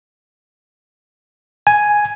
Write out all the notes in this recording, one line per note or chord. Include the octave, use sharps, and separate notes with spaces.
G#5